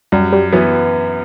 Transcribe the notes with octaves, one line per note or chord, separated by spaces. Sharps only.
F#2 G3
G3
E3 F#3 B3